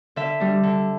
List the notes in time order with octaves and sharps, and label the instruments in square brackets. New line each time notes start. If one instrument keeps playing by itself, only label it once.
[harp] D3 E5
G3 D4
D3